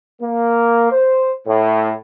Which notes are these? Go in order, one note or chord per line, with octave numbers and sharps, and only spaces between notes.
A#3
C5
A2